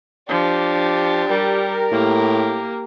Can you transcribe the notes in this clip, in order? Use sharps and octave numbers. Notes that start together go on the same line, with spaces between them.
F3 D4 G4
G3 A#4
A2 A#3 G4